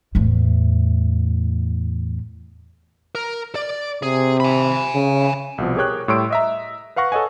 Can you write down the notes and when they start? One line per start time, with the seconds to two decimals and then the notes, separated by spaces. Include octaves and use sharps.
0.15 E2 A2
3.15 A#4
3.55 D5
4.03 C3 G#4
4.40 G#5 B5
4.95 C#3
5.58 C2 B2 F3
5.76 G4 G#4 A#4 C#5 G5 F#6
6.08 A2 G3 C#5 C6 E6 D7
6.30 D#5 E5 A#5
6.96 B4 F5 F#5 C#6 A#6
7.12 A4 C#5 D#5 F#5 G#5